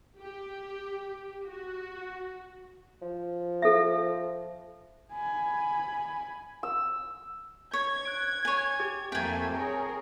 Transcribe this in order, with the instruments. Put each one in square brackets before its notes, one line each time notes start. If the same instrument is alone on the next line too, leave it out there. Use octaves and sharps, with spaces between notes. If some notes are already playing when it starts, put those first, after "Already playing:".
[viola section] G4
F#4
[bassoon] F3
[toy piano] A4 E5
[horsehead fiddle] G#5 B5
[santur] E6
[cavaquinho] C#5 [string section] G#6
[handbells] F#6 D7
[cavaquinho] C#5 G#5
[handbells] G4
[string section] F2 A3 A#3 [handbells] C4 [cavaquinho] G5 G#5
[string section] G#4 A#4 C#5